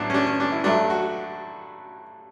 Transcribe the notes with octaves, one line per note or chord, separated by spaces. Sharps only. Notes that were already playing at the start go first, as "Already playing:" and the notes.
Already playing: A1 A2 F#3 B3 D4 E4
C#4
D4
C#4
D4
E4
G2 F#3 A3 D4
F#4